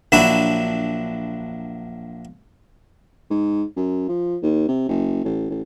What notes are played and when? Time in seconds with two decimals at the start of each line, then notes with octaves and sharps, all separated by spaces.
0.12 A#1 F#3 D4 E4 F#4 B5
3.30 G#2
3.76 F#2
4.09 F3
4.42 D#2
4.68 C3
4.88 F#1
5.24 A1
5.49 A1